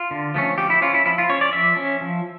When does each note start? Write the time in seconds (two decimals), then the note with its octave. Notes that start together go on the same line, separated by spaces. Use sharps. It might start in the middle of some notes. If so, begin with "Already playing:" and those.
Already playing: F4
0.11 D3
0.34 F3 A3 C#4
0.58 F3 G4
0.70 E4
0.82 C#4 F4
0.94 E4
1.06 F3 E4
1.18 F4
1.29 C#4 C#5
1.41 D5
1.53 F3 E5
1.77 C#4
2.01 F3